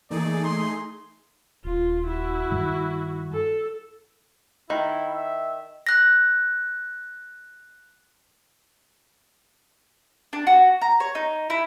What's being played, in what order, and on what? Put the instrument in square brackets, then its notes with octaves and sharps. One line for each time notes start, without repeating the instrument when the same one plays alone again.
[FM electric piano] E3 A#3 [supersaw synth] A3 D#4 G#4 [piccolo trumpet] D5
[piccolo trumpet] C6
[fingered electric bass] D#1 [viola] F4
[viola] E4 F#4
[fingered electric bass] G2 D#3 G3
[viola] A4
[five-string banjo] D#3 [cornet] E4
[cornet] E5
[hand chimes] F#6 A#6
[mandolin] D4
F#4
A#5
C#5
D#4
E4